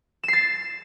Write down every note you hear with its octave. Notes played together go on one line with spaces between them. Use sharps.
A6 C7 E7